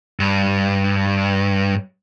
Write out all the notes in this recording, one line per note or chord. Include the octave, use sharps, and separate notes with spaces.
G2